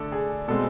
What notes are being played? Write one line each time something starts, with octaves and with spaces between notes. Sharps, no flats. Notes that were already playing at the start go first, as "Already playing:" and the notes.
Already playing: D3 A3 A4 D5
G#4
B2 G#3 C4 A4